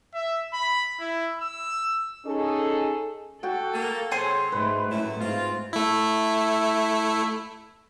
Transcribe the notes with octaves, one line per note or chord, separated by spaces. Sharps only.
E5
B5
E4
E6
C#4 D#4 G#4 A4
F#4 A4 G5
A#3
C3 F#3 G#4 C5 C#5 C6
G#2 A3 B4
F#2 A2 A3 C#4 E4
G#2 C4 F4
A3 E4